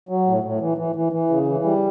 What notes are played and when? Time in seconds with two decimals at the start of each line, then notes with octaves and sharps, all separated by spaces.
0.09 F#3
0.26 A2
0.43 A2
0.61 E3
0.78 E3
0.96 E3
1.13 E3
1.30 C#3
1.47 E3
1.64 G3